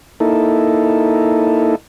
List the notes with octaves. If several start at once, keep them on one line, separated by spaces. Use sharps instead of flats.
A#3 D#4 E4 A4